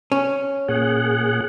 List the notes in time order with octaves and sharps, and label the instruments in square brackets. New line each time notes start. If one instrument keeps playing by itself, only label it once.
[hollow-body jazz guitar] C#4
[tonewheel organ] A#2 G#4 F#5